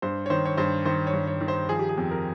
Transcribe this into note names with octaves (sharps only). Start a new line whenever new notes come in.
G2 C5
C#5
D#3 C5
C#5
G2 C5
D#3 C5
C#5
G2
C#5
D#3
C5
F3 G#4
G4
G#4
F2
A#4